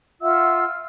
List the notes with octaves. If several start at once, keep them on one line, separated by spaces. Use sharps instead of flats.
F4 E5 F#5 E6